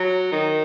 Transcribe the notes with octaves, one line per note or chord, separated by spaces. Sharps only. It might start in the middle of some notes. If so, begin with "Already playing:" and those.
Already playing: F#3
D#3